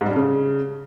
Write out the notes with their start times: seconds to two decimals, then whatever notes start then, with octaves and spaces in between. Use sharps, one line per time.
0.01 G#2
0.06 G3
0.11 G2
0.16 C#3